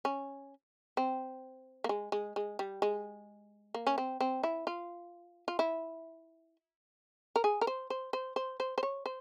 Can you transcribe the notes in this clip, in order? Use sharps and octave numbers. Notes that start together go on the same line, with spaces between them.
C#4
C4
A#3
G#3
G#3
G#3
G3
G#3
A#3
C#4
C4
C4
E4
F4
F4
E4
A#4
G#4
A#4
C5
C5
C5
C5
C5
C5
C#5
C5